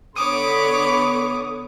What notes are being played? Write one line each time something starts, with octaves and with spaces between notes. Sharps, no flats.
D3 B3 C#5 B5 D6 D#6